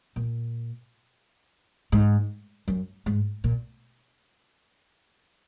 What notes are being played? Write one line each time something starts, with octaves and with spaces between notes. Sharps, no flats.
A#2
G#2
F#2
G#2
A#2